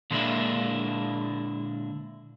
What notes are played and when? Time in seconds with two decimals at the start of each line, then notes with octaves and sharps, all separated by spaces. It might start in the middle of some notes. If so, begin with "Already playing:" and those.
0.11 A#2 D3 G#3 A#3 D4 E4